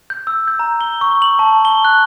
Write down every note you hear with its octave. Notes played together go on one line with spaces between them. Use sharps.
G6
E6
G6
A#5
G7
C#6
F#7
A5
G7
F#6